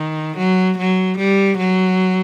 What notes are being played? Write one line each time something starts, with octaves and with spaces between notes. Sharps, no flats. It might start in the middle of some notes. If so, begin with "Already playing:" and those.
Already playing: D#3
F#3
F#3
G3
F#3